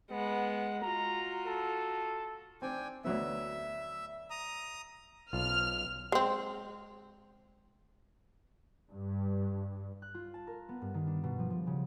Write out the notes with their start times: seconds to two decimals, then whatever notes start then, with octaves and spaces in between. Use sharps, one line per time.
0.11 G#3 B3 F#5
0.83 F4 F#4 A#5
1.46 A4
2.62 C4 D4 G5 G#5
3.05 D2 F#3 B3 E5
4.30 A#5 D#6
5.33 B1 F4 F6
6.12 G#3 C4
8.90 G2
10.02 F#6
10.14 F4
10.34 A5
10.47 A#4
10.69 B3
10.82 G2
10.94 D#3
11.07 D4
11.23 B2
11.39 F3
11.50 F3
11.67 C#3